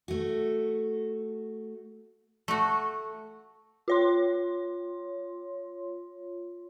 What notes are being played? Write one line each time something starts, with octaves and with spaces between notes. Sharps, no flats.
A3 F#4
A3 F#4
F4 C#5 C6